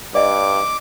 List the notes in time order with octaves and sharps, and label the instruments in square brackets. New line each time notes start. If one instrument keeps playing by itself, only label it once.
[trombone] G2 [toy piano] D5 D#5 [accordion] D6